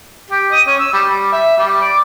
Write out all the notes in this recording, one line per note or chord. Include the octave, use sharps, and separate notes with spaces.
G4
D#5
C#4
E6
G3
G3
E5
G3
D5